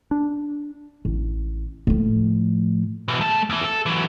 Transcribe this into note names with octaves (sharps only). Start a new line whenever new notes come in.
D4
A1
A2 F3
B2 E3
A3 A5
E2 E3
A4
E3 F#3